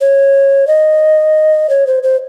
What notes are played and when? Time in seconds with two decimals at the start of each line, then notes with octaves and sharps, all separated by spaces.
0.01 C#5
0.67 D#5
1.70 C#5
1.87 C5
2.03 C5